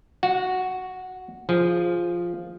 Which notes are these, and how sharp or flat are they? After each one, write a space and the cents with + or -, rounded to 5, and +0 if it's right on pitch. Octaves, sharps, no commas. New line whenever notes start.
F#4 +0 F#5 -35
F3 +0 G#4 +0